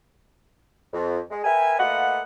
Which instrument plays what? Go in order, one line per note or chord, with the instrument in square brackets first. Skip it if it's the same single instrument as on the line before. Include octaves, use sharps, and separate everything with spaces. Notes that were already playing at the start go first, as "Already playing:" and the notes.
[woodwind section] F2
G#3
A#4 B4 E5 G5 G#5
A3 A#3 F4 B4 D#5 F#5